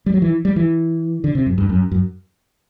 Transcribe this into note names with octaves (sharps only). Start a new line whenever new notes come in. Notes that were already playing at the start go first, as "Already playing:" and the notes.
G3
F#3
E3
G3
E3
D3
C3
F#2
G2
F#2
F#2